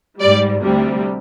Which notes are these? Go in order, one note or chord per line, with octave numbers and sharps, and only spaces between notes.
G#2 G3 D5
D2 C3 G3